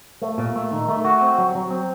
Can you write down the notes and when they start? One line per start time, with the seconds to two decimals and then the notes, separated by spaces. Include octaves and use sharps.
0.22 A3
0.38 A#2
0.56 A3
0.72 D#3
0.89 A3
1.05 F#4
1.21 C4
1.38 F#3
1.55 F#3
1.71 C4